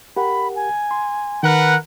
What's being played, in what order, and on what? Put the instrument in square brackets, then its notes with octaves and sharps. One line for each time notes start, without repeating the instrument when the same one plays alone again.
[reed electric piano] G4 A#4 F#5 [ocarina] B5
[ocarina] G#5
[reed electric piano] C6
[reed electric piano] D#3 [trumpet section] A#4 B4 F#5